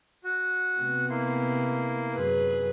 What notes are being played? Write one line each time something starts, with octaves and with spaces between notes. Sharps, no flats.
F#4
C3 A3 B3
A#3 E4 C6
F#2 G#4 B4